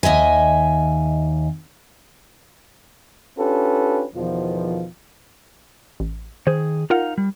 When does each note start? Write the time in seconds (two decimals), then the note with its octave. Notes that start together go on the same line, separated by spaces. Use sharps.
0.03 D#2 D#5 E5 G#5
3.38 C#4 D4 F4 G4 A4 B4
4.14 E2 B2 D#3 F3
6.00 A1
6.47 D#3 G#4 C5
6.90 D#4 F4 A#4 F5 F#5
7.18 G3